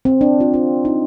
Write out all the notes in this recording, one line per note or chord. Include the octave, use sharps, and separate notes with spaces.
C4
D4
F4
F4
D#4